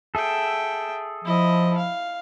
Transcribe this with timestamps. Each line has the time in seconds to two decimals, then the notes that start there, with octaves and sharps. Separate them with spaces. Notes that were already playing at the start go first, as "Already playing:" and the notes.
0.15 G#4 A4 E5 G5
1.25 F3 E4 D#5
1.77 F5